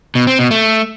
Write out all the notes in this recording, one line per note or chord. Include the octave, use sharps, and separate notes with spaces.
B2
C4
B2
A3